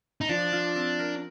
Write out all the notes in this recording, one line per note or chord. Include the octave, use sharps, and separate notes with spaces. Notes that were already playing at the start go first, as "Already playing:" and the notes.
D#4
F3 D4
F4
C4
A#4